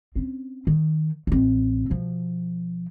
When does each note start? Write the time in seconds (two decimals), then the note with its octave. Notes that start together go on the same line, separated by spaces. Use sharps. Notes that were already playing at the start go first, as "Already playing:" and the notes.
0.15 C4 C#4
0.67 D#3
1.27 A1 C4
1.90 B2 F3